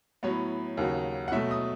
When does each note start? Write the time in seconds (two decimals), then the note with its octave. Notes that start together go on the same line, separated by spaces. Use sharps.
0.23 A2 F#3 B3 C#5
0.77 D#2 C#3 F#3
1.28 F#5
1.32 B2 F#3 A3 E5
1.51 D#6